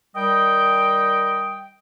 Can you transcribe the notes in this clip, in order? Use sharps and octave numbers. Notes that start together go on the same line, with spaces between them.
D#3 G3 D#5 G5